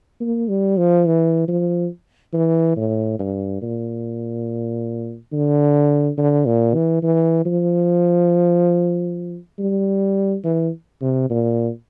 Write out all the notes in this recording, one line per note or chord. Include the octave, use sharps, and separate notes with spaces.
A#3
G3
F3
E3
F3
E3
A2
G2
A#2
D3
D3
A#2
E3
E3
F3
G3
E3
C3
A#2